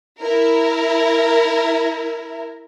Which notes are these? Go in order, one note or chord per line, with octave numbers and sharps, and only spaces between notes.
E4 A#4